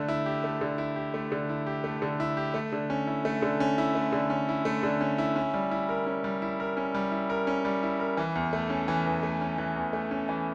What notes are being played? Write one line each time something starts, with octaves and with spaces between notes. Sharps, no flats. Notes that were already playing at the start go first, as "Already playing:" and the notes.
Already playing: D3 A3
E4
G4
A3
D3
E4
G4
A3
D3
E4
G4
A3
D3
E4
G4
A3
D3
C#4
E4
A3
D3
C#4
E4
A3
D3
C#4
E4
A3
D3
C#4
E4
C#4
G3
E4
A#4
C#4
G3
E4
A#4
C#4
G3
E4
A#4
C#4
G3
E4
A#4
E3
E2
A3
C#4
E3
E2
A3
C#4
E3
E2
A3
C#4
E3